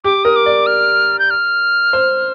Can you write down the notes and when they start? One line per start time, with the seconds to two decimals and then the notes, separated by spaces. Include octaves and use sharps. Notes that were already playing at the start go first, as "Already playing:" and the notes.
0.04 G4 D6
0.24 A#4 D#6
0.36 D6
0.46 D5
0.66 F6
1.19 G6
1.30 F6
1.93 C5